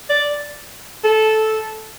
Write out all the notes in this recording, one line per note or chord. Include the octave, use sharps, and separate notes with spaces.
D5
A4